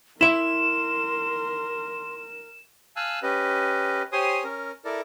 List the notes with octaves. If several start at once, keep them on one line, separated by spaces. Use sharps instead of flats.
E4 A#4 E5 C6 E7
F5 G#5 A5 E6 F#6
C#4 G4 B4 D#5
G4 C5 C#5 G#5 C6 D#6
C#4 A#4
E4 A4 A#4 D5